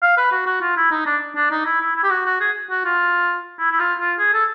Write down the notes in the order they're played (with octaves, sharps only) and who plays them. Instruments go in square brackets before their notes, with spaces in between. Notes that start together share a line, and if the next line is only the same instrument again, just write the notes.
[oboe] F5
B4
F#4
F#4
F4
E4
D#4
D4
D4
D#4
E4
E4
E4
G4
F#4
F#4
G#4
F#4
F4
E4
E4
F4
F4
G#4
A4